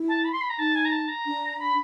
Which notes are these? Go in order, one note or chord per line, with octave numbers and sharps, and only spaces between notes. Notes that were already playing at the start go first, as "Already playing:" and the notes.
Already playing: E4
A5
B5
C6
B5
A#5
D#4 A5
G#5
A#5
A5
A#5
D4
B5